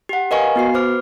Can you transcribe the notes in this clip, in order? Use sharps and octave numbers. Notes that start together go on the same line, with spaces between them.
G4 F#5
A#4 B4 D#5 F5 G#5 C#6
B3 F#4 C7
B4 C5 D6 F6